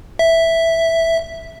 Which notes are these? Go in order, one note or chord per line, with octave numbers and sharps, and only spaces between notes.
E5